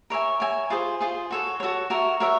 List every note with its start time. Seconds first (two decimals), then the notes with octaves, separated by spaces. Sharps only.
0.10 A#4 C#5 E5 G#5
0.40 A#4 C#5 E5 G#5
0.70 F4 G#4 C5
1.00 F4 G#4 C5
1.31 F#4 A4 C#5
1.60 F#4 A4 C#5
1.90 F#4 A#4 C#5 E5
2.20 F#4 A#4 C#5 E5